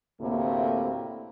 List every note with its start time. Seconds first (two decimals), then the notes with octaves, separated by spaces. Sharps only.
0.20 D2 A2 C3 A#3